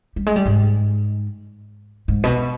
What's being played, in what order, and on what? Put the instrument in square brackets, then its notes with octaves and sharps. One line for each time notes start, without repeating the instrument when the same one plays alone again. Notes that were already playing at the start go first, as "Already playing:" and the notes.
[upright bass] G3
G#3
G3
G#2
G#2
B2